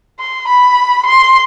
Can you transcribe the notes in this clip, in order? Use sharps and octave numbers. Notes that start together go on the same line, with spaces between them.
C6
B5
C6